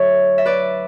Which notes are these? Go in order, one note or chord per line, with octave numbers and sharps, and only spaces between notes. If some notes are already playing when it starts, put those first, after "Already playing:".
Already playing: D2 D3 F#3 D4 A4 C#5 E5
E5
B4 D5